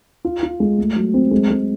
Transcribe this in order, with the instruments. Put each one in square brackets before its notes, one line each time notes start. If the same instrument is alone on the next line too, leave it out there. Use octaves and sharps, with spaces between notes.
[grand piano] F4
F4
G#3
A3
F#3
C4
G#3
G#3